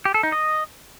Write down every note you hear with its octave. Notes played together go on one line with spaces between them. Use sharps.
G4
A4
D#4
D#5